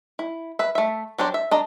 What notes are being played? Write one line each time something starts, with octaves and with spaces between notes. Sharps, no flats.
E4
B4 E5
A3 E5
F#3 D4 G4 C5
E5
D4 D#5 A#5